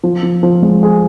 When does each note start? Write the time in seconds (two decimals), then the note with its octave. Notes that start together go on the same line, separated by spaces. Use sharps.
0.03 F3
0.23 F3
0.43 F3
0.62 G#3
0.83 G#4